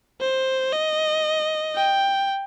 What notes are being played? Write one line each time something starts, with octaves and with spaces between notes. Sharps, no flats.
C5
D#5
G5